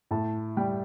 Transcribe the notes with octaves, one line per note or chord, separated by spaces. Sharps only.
A2 A5
G3 G5